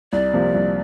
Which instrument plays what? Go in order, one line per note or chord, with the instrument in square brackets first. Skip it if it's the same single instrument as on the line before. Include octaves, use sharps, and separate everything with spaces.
[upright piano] C2 [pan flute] D5
[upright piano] C3 F3 A#3
C2